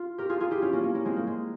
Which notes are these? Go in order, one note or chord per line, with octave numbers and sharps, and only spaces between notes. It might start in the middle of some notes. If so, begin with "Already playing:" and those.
Already playing: F4
G4 A#4
F4 G#4
F4 G#4
E4 G4
C#4 F4
A#3 C#4
A#3 C#4
A#3 C#4
G#3 C4
A#3
G#3